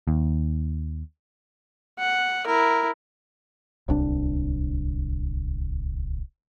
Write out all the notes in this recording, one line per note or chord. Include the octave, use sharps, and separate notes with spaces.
D#2
F#5
E4 A#4
D1 C2 D4